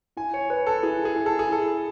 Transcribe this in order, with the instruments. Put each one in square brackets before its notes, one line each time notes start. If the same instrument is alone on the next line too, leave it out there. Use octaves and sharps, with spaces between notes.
[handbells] E4 [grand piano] G#5
[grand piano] C#5
[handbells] B4 [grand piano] C#5
[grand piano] A4
[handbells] E4 [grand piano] G#4
[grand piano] G#4
[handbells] E4
[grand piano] A4
G#4
[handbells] E4 [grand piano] A4